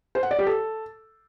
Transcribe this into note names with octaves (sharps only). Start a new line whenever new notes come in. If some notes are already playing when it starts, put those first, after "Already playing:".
C5
F#5
D5
G4
A4